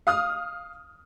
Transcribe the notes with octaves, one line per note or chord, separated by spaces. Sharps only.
F5 D#6 F6